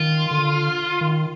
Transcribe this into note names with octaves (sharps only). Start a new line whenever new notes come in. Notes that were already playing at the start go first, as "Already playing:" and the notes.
Already playing: D#3 F4
D3
D#3